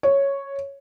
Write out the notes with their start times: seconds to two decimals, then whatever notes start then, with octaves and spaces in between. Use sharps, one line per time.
0.03 C#5